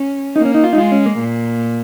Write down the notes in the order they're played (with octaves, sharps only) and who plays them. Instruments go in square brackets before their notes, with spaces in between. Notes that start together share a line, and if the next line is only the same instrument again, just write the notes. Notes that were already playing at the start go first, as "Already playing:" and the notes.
Already playing: [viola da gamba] C#4
[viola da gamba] A#3 [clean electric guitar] D#4
[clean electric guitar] C#4
D#4
F4
D#4
[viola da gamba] G#3 [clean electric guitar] F4
[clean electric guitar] C#4
A#3
[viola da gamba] A#2